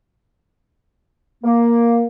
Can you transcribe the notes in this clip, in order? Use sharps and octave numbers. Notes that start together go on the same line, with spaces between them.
A#3